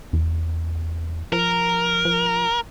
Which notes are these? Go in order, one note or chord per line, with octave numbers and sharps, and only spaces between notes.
E2
F3 A#4
F3